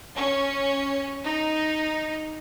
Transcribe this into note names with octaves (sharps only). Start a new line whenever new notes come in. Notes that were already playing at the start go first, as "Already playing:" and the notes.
C#4
D#4